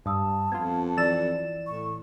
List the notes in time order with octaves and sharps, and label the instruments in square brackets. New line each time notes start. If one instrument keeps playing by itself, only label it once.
[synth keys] G2 [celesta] F5 D#6 E6 [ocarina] A5
[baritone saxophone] F2 [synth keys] B3 F4 [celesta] G#6
[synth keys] E3 E7 [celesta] D5 E6 A6
[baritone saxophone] A2 [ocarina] C#6